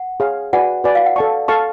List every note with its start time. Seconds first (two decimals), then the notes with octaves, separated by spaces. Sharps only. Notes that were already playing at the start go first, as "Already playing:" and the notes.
Already playing: F#5
0.20 G#4 C#5 F5
0.53 F#4 B4 D5 F#5 G#5
0.84 F#4 B4 D5 G#5
0.95 F5
1.06 F#5
1.16 A4 D5 F5 A5 C#6
1.48 A4 F5 A5 C#6